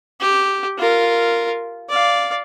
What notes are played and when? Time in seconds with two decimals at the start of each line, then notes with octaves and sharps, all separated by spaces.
0.20 G4
0.78 F4 A#4
1.89 D5 F5